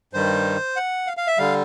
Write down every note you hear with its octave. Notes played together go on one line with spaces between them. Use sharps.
G2 D#3 G3 C5
F#5
F5
F5
E5
D3 G3 F5